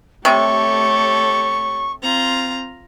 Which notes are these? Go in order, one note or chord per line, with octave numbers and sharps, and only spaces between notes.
C3 A3 G4 A4 C#5 C#6
C4 F4 A#5